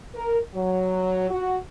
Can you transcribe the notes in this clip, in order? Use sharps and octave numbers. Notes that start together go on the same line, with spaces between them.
A#4
F#3
F#4